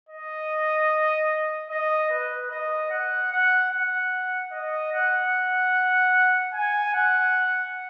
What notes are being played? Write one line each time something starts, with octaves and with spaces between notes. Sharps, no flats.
D#5
D#5
B4
D#5
F#5
F#5
F#5
D#5
F#5
G#5
F#5